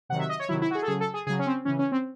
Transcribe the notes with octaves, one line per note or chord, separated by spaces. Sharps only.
C3 D#3 F#3 F#5
E5
D#5
C#5
C3 D#3 F#3 E4
E4
F#4
G#4
A4
C#3 F#3 G#4
A4
G#4
C#3 F#3 G#4
C#4
C4
C#3 E3 C#4
C#4
C4